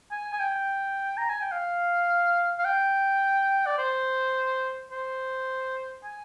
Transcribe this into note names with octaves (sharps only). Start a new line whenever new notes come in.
G#5
G#5
G5
A#5
G#5
G5
F5
F5
G5
D5
C5
C5
G#5